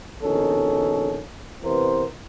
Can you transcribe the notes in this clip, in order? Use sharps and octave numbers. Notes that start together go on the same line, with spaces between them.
A#1 B2 D#3 C#4 A4
C3 E3 B3 A#4 C5